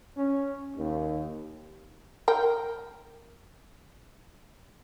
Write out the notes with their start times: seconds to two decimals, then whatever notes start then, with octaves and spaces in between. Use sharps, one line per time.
0.17 C#4
0.76 D#2
2.28 A#4 G5